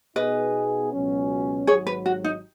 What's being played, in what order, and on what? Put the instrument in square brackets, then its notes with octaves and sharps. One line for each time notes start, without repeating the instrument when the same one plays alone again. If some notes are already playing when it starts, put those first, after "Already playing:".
[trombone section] B2 B3 D#4 G#4 [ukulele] B4 D#5
[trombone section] C#2 B2 F#3 C#4
[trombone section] G#1 G#2 F#3 [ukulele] G#4 C#5
[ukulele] B4
F#4
D#4